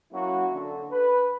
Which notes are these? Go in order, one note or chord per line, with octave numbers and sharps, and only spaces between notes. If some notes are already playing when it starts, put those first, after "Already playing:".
F#3 A#3 C#4 E4 F#4
D3
B4